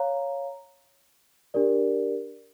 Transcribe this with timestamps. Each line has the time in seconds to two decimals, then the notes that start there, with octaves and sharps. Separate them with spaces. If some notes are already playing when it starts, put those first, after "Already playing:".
Already playing: C#5 F5 A#5
1.54 D4 G4 A#4 D5